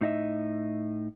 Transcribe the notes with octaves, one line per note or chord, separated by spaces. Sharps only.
A2 D#4 D#5 E5